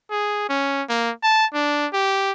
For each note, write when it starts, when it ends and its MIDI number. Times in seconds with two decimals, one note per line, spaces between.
0.11 0.46 68
0.49 0.83 61
0.89 1.11 58
1.23 1.46 81
1.54 1.87 62
1.93 2.32 67